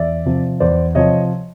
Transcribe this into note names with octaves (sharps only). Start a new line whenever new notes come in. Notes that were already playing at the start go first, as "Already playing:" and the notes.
Already playing: E2 D5 E5
C3 F3
E2 C5 D5
C3 F3 C#5 D#5